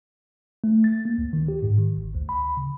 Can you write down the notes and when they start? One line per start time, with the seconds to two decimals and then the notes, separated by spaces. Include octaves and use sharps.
0.64 A3
0.84 A6
1.05 A#3
1.18 D2
1.33 D#3
1.48 G4
1.63 G#2
1.78 D#3
1.96 G#1
2.14 D2
2.29 B5
2.57 C#3